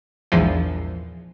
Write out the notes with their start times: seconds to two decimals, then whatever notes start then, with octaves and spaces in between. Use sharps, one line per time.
0.32 A#1 E2 G#2 E3 F3